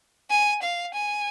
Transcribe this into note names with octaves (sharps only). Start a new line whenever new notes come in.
G#5
F5
G#5